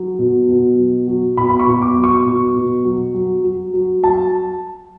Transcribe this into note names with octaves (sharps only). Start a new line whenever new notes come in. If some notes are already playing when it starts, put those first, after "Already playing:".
Already playing: F#3
B2
B2
F#3
F#3
B2 B5
B5
C#6
B2
D6
F#3
C#6
B2
B2
F#3
F#3
F#3
F#3
F#3 A5